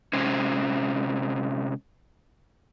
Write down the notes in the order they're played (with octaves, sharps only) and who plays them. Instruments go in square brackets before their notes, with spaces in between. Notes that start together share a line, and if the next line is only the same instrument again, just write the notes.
[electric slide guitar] C3 G#3 C#4 C5